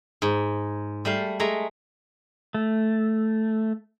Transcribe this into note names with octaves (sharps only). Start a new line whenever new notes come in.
G#2
G3 A3 F5
G#3 A3 A#5
A3